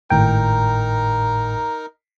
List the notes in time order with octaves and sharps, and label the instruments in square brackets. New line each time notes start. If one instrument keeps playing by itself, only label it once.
[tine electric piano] G#1 A2 G5 [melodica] D#4 A#4